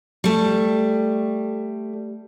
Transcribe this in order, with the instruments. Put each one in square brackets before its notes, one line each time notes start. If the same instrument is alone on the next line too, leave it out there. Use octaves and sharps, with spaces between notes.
[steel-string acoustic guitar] G3 A3